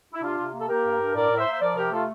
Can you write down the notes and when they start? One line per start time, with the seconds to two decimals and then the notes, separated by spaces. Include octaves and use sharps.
0.13 E4
0.22 C3 D4 F4
0.38 C3
0.53 A#3
0.60 A4
0.69 A#3 G4 A#4
0.84 G2
1.00 G2
1.15 A2 A#4 D5
1.31 A2
1.38 C5 E5
1.46 A#3
1.53 E5
1.61 F3 A#4 D5
1.76 C3 G4 A#4
1.92 A3 F4 A4